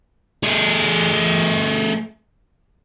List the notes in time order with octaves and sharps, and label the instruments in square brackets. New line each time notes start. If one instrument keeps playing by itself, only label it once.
[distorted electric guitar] A3 G#4